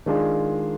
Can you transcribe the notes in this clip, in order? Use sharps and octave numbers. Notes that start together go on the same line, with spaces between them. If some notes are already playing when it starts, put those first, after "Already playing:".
D#3 G#3 D4 F4 G#4